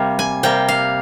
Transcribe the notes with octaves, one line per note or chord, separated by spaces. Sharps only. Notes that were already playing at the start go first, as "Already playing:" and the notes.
Already playing: C3 G3 A#3 F5
G#5
C3 G3 A#3 G5
F5